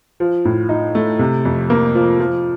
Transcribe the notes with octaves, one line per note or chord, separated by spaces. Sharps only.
F3
A2
D#4
A3
C3
F2
A#3
F3
F3